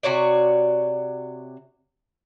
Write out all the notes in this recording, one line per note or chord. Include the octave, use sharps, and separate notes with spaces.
C3 F#4 C#5 D5